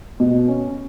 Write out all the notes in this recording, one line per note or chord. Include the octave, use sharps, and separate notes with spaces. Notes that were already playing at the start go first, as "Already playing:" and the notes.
B2
C#4